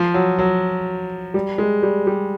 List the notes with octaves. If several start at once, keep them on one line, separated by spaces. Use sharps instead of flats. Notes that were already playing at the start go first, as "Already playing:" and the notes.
Already playing: F3
F#3
F#3
G3
G#3
G3
G3